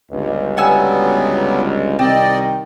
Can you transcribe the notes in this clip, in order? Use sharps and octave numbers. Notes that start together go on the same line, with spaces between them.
G1 C#2
F#3 G3 B3 F#5 G#5 E6
C2 D#3 C4 D5 D#5 G5